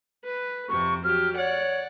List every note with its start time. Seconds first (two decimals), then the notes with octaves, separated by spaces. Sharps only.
0.24 B4
0.69 F2 C3 C4 C#6
1.04 F#3 G4 F6
1.36 C#5 D5 F#5